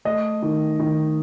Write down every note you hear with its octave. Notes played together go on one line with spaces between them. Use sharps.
A3 D#5
D#3
D#3